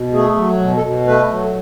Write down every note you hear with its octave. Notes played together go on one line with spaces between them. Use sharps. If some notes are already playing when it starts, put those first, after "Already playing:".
Already playing: B2
A3 G#4
F#3
B2
A4
B2
A3 B4
F#3